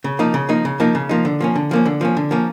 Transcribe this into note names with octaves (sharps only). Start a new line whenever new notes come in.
C#3
F3 A#3 D#4
C#3
F3 A#3 D#4
C#3
F3 A#3 D#4
C#3
F3 A#3 D#4
D3
F3 A#3 C#4
D3
F3 A#3 C#4
D3
F3 A#3 C#4
D3
F3 A#3 C#4